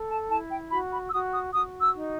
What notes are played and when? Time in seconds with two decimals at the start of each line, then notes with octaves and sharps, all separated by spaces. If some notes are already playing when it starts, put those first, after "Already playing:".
Already playing: A4
0.09 A5
0.29 E4 A5
0.50 G5
0.70 F#4 B5
0.92 B5
1.08 E6
1.12 F#4 D#6
1.33 D#6
1.53 F#4 D#6
1.81 E6
1.95 D#4